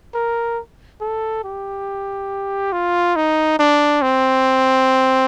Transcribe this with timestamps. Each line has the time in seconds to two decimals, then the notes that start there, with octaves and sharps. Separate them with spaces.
0.14 A#4
1.01 A4
1.44 G4
2.72 F4
3.16 D#4
3.59 D4
4.02 C4